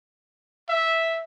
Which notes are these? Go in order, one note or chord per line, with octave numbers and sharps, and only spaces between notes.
E5